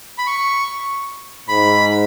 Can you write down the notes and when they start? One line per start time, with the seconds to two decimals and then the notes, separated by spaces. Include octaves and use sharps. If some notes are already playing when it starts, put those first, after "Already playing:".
0.18 B5
0.27 C#6
1.49 G#2 B5